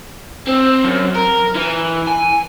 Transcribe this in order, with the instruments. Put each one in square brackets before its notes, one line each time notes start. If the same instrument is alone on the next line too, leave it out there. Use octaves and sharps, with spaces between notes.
[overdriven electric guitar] C4
F#2
A#4
E3
G#5